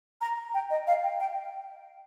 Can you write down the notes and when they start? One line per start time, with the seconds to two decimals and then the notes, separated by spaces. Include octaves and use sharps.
0.21 A#5
0.54 G5
0.70 D#5
0.87 F5
1.03 G5
1.20 G5